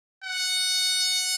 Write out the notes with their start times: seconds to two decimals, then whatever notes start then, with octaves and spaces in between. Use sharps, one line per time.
0.24 F#5